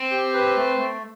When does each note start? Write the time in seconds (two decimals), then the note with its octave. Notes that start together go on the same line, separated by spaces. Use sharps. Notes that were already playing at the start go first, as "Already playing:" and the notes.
Already playing: C4
0.11 G4
0.33 B4
0.56 A3
0.79 A3